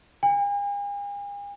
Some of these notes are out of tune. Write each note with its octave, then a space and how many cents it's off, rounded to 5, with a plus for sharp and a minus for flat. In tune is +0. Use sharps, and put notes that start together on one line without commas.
G#5 -45